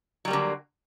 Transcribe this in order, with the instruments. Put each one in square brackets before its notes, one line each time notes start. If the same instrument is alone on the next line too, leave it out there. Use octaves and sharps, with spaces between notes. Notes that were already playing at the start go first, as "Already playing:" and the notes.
[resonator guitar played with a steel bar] F#3
G3
A#3
D3